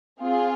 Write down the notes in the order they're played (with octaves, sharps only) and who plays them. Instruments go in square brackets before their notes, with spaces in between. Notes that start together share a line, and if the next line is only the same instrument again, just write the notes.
[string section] C4 F4 G#4